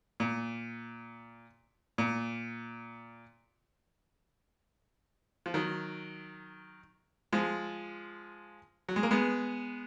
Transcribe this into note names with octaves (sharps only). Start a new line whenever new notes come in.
A#2
A#2
F3
D#3 F#3
F3 G#3
F#3
G#3
A#3
G#3 B3